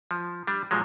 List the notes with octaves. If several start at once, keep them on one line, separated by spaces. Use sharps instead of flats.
F3
G3 D4
A#2 F3 F#3 G#3